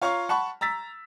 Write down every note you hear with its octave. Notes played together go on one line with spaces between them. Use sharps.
F4 C#5 F5 A#5 C#6
F#5 A5 B5 C#6
A#5 E6 A6 B6